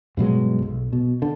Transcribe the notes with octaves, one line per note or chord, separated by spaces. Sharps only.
G2 B2 F#3 G#3
B1
B2
D3